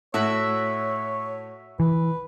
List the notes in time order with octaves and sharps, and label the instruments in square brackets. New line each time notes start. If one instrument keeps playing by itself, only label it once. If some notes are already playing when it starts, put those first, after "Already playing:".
[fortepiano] A2 [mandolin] F#4 E5 [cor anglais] C#5
[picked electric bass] E3 [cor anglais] B4